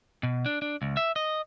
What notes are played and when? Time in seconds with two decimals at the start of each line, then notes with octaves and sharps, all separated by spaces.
0.23 B2
0.46 D4
0.62 D4
0.82 C#2
0.97 E5
1.16 D#5